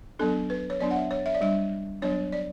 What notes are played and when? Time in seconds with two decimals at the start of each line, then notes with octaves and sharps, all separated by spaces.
0.19 F#3 B3 D4 A4
0.50 B4
0.70 C#5
0.80 F#3 B3 D4 D5
0.91 F#5
0.96 E5
1.11 C#5
1.26 E5
1.34 D5
1.41 G3 D4 E5
2.02 F#3 B3 D4 C#5
2.32 D5